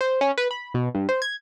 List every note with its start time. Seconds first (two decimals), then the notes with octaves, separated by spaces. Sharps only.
0.01 C5
0.21 C#4
0.38 B4
0.51 B5
0.74 B2
0.95 G2
1.09 C5
1.22 G#6